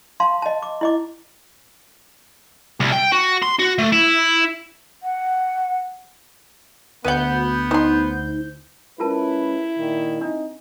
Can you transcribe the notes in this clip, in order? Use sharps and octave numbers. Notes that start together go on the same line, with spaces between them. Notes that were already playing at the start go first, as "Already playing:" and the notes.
F5 A5 C6
D#5 A5
D6
E4 D#5 D6
C2
G5
F#4
C6
F#4
A3
E4
F#5
D2 B3 B4 F#5 G6
D#4 C5 C6
G#3 C#4 E4 F4 A#4 B4 A5
A#2 D#3
C4 D4 D#4